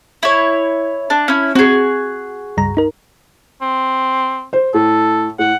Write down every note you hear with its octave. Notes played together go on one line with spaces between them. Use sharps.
E4 C#5
D4
C#4 E4
C4 F#4 G#4
C#2 G2 A#5
D#4 A#4
C4
C5
A2 A4
A2 F#5